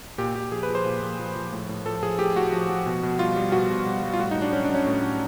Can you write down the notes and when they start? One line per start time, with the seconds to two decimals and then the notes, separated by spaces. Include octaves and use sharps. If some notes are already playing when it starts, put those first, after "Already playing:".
0.18 A#2 G4
0.35 A#2 G4
0.52 F3 G#4
0.63 B4
0.69 F3
0.75 C5
0.85 A#2
1.02 A#2
1.19 F3
1.35 F3
1.53 A2
1.69 A2
1.86 F3 A4
2.03 F3 G#4
2.19 A2 G4
2.36 A2 F#4
2.53 F3
2.69 F3
2.86 B2
3.03 B2
3.19 G3 F4
3.36 G3
3.52 B2 F#4
3.70 B2
3.86 G3
4.03 G3
4.13 F4
4.19 A2 F#4
4.31 D#4
4.36 A2
4.42 D4
4.53 F#3 C#4
4.64 D4
4.70 F#3 C#4
4.87 A2
5.03 A2